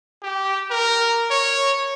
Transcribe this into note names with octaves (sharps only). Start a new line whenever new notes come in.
G4
A#4
C#5